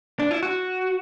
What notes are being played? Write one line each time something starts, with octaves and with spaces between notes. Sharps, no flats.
D4
E4
F#4